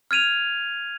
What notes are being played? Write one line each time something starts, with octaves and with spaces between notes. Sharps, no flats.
F6 G#6 D#7 F7